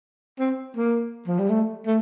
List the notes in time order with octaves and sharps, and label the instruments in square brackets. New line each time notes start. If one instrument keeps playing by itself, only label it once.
[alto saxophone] C4
A#3
F3
G3
A3
A3